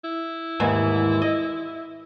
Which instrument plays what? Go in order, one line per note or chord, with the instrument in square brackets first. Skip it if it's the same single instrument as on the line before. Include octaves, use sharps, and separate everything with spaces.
[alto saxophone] E4
[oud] D#2 G#2 E3
D#5